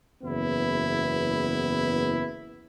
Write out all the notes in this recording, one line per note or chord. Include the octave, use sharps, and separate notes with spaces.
F#1 E2 B3 E4